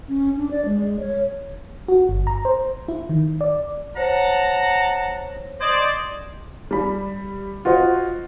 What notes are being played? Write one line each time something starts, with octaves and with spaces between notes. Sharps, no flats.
C#4
D4
D5
G#3
C#5
F#4
G1
A#5
C5
E4
D#3
D5
C5 C#5 F#5 A5 A#5
C5 D5 D#5 G#6
G3 B5
F4 F#4 C5 D#5